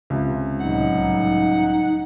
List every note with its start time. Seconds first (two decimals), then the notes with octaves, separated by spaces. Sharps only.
0.10 C#2 C3
0.61 C2 A2 F#3 D#4 F#5